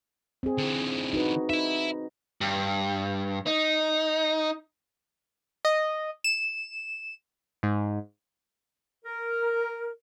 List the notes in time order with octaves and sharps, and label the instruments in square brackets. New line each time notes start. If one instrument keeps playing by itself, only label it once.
[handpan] C4 G#4
[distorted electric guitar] D3 E3
[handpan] D#4 F#4 B4
[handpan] D#4 [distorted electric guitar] E5 B5
[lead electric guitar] G2
D#4
[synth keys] D#5
E7
G#2
[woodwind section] A#4